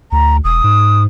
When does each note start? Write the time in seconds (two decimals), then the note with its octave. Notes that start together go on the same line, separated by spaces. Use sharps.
0.12 D2 A#5
0.44 E1 D#6
0.64 G#2